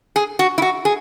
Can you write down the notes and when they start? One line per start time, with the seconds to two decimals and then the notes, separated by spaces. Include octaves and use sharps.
0.16 G#4
0.39 F#4
0.58 E4
0.62 F#4
0.85 G#4